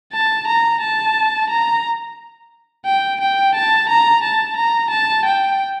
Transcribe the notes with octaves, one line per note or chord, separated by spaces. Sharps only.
A5
A#5
A5
A#5
G5
G5
A5
A#5
A5
A#5
A5
G5